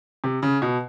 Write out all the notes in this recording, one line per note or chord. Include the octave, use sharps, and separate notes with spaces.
C3
C#3
B2